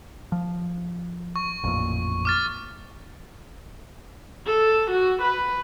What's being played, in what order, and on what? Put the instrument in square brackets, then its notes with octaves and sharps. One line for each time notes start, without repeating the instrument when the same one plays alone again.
[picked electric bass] F3
[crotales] C#6
[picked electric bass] A1 F2 A#2
[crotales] D6 F6 A6
[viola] A4
F#4
B4